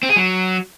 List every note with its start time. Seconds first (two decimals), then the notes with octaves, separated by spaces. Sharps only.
0.03 C4
0.10 G#4
0.16 F#3